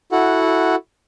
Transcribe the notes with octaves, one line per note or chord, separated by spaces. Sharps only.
E4 F#4 A4 F#5